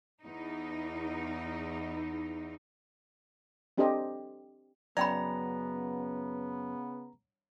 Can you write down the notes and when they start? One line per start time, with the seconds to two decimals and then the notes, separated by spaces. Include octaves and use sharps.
0.20 E2 D#4
3.78 C4 D4 G4 A4 C5 D#5
4.97 F#2 C#3 B3 D5 G5 A#5 B5